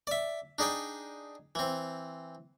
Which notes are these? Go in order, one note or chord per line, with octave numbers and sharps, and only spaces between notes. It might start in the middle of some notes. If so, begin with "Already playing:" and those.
D5 E5
D4 D#4 G#4 D5 G5
E3 C4